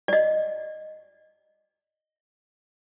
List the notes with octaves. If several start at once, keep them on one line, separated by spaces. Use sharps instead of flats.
D5 D#5